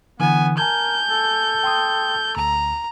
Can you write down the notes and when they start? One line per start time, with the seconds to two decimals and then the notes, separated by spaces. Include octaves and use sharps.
0.20 D3 E3 B3 G#5
0.57 A#4 G#5 A5 G6 G#6
1.09 A4
1.63 G5 C6 D#6
2.37 D2 A#5